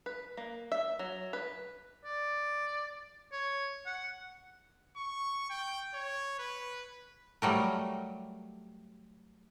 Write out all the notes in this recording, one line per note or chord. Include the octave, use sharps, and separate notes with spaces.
B4
A#3
E5
F#3
B4
D5
C#5
F#5
C#6
G5
C#5
B4
F#3 G3 A3 A#4